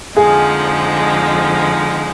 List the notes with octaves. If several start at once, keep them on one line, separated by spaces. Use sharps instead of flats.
F2 D3 F3 G#3 D#4 G#4